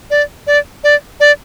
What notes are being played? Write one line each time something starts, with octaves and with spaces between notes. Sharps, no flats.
D5
D5
D5
D5